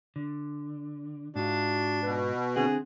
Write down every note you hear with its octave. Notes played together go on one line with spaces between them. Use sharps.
D3
G#2 D4 F4 F#4
B2 B4
D3 C4 G#4 F#5